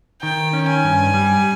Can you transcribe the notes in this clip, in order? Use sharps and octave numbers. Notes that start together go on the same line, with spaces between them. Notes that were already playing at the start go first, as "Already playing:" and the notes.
D#3 G5
C#4
G#5
G2
G3